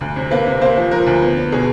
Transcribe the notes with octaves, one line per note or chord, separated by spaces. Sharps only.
D2
C3
A#3 B4
C3
A#3 C5
F3
F3 A#4
D2
B3
B3
B2 G#4